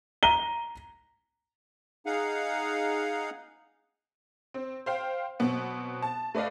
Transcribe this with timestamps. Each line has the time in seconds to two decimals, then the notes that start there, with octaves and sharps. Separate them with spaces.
0.23 A#5 D#7 G7
2.06 D#4 G#4 F5 F#5
4.54 C4
4.86 C5 F5 G5
5.39 B2 F#3 B3 C4
6.02 A5
6.35 A3 B4 D5 D#5 F5